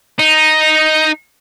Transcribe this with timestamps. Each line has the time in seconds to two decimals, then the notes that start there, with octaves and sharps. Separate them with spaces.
0.19 D#4